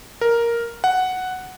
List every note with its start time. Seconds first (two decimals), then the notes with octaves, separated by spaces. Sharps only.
0.21 A#4
0.84 F#5